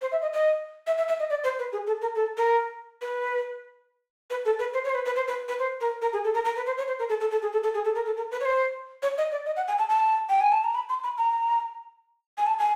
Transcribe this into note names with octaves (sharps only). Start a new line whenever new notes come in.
C5
E5
D#5
D#5
E5
E5
E5
D#5
D5
C5
B4
G#4
A4
A#4
A4
A#4
B4
B4
A4
B4
C5
C#5
C5
B4
B4
C5
B4
B4
C5
A#4
A#4
G#4
A4
A#4
A#4
B4
C5
C#5
C5
A#4
A4
A4
A4
G#4
A4
A4
G#4
A4
A#4
A4
A#4
B4
C#5
C5
C#5
D#5
D5
D#5
F#5
G#5
A5
A5
G5
G#5
A5
A#5
B5
C6
B5
A#5
G#5
A5
G#5